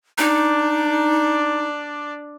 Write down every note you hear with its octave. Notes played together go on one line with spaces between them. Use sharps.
D4 D#4 D5